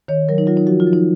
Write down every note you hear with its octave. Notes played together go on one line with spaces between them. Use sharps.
D#3 C#5
F#3 A#4
D#4
F#3 F4
D#4
F3 F#4
F4
F3
D#4